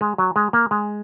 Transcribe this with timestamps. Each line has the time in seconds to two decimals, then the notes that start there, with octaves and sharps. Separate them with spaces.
0.01 G#3
0.18 F#3
0.36 G#3
0.53 A#3
0.71 G#3